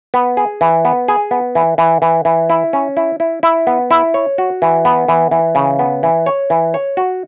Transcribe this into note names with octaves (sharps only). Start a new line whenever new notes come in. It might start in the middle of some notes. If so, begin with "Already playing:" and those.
B3
G#4
E3
B3
G#4
B3
E3
E3
E3
E3
E4
C#4
E4
E4
E4
B3
E4
C#5
F#4
E3
B3
E3
E3
C#3
B3
E3
C#5
E3
C#5
F#4